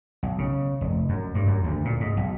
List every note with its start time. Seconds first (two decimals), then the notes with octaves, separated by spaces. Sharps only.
0.23 B1
0.38 C#3
0.81 F1
1.09 F#2
1.35 G2
1.47 F#2
1.64 D2
1.85 A#2
2.00 G#2
2.17 B1